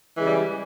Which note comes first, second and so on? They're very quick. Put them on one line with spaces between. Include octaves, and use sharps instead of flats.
E3 G#3 C#3 G3